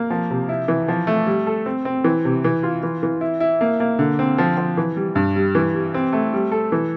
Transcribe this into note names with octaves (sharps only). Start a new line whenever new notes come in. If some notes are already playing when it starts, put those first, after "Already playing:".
Already playing: A#3
F3
C3
E4
E3
F3
A3
G3
A4
C4
C4
E3
C3
E3
F4
E3
E3
E4
E4
A#3
A#3
D3
C4
F3
F3
E3
G3
G2
G3
E3
G3
C4
A3
G3
A4
E3